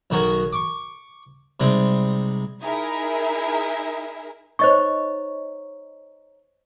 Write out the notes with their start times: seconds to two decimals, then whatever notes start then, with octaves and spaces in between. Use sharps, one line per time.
0.10 B1 D#3 F#4 A#4 G#5
0.53 C#6 D6
1.60 C3 G3 G#3 D#4
2.62 D#4 E4 G#4 A#4 E5
4.59 D#4 C5 C#5 D#5 C#6